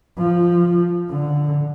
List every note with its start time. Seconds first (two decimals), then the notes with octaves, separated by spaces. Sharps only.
0.18 F3
1.10 D3